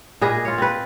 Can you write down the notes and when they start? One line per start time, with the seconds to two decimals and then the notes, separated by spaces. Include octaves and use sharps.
0.21 A#2 G#4 B4 D#5
0.45 F4 C#5
0.58 C4 B4